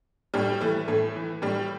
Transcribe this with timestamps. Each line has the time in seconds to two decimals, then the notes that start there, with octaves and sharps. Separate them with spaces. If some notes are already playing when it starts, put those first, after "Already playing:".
0.34 A2 G3
0.61 E3 A3
0.88 A2 A3
1.16 E3
1.42 A2 G3